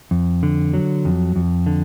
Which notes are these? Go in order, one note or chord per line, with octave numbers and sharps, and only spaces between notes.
F2
D3
F#3
F2
F2
D3